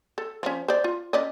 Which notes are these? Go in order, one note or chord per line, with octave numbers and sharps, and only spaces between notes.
A4
F3 C#4
C5 D5
F4
C#4 D5 D#5